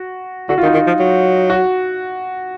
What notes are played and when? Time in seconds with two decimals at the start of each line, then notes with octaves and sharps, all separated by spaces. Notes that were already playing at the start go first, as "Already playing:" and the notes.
Already playing: F#4
0.49 D3 F#4
0.58 F4
0.63 D#3
0.66 D#4
0.74 D#3 F4
0.87 F3
0.99 F#3
1.50 F#4